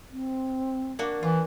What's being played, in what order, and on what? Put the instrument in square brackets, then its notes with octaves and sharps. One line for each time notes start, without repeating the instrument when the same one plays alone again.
[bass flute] C4
[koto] A#3 D4 F#4
[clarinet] E3 [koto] F4